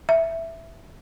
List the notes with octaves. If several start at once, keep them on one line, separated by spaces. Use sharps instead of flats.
E5